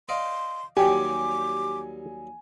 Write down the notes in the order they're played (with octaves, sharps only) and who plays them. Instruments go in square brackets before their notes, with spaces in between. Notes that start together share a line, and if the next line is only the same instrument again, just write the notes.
[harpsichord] D5 D#5 F5 [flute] C6
[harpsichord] D#2 F#3 G3 [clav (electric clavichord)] G4 [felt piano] G#5 [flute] D6